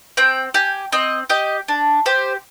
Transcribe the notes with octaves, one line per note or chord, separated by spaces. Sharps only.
C4 G5
G4 G#5
C4 D#5
G4 D#5
D4
G4 C5